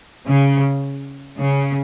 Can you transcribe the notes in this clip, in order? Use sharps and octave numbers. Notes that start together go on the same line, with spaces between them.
C#3
C#3